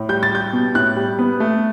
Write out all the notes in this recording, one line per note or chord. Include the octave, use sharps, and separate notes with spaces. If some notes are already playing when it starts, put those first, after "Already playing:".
Already playing: A2
G3 G6
A6
G3 G6
B2
A2 F#6
G3
B3
A3